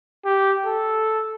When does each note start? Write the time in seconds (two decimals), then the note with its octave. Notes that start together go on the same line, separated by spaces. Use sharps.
0.26 G4
0.66 A4